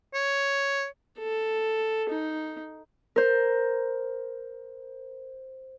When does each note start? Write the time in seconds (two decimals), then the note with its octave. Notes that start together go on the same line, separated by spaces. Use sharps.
0.14 C#5
1.19 A4
2.09 D#4
3.16 A#4 C5